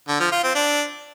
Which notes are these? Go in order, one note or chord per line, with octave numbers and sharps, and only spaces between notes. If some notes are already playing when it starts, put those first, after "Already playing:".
D3
F3
F4
C4
D4